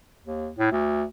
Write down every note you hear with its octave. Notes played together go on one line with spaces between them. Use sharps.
D#2
A2
D2